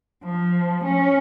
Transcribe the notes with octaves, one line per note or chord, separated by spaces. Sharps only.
F3
C#4